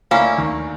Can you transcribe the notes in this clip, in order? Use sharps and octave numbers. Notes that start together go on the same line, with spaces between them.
D2 D3 A#3 C#4 E4
D#2 D#3